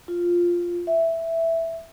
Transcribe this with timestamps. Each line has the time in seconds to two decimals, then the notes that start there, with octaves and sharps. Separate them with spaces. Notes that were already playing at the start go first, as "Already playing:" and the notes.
0.08 F4
0.87 E5